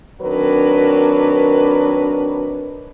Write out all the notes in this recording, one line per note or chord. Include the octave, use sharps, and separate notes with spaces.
D#3 F#3 C4 D4 A#4 B4